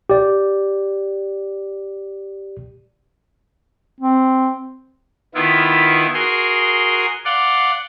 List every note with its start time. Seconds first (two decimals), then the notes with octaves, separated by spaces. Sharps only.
0.10 G4 D5
4.00 C4
5.35 D#3 B3 E4 F4
6.14 F#4 G#4 A#4 C6
7.25 D5 F5 F#5 C6